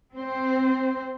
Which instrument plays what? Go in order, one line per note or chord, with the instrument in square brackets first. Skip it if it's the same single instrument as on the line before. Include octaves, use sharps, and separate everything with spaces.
[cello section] C4 C5